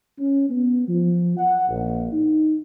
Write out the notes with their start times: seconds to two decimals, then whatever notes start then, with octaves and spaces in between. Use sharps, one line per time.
0.18 C#4
0.50 B3
0.88 F3
1.38 F#5
1.68 A#1
2.12 D#4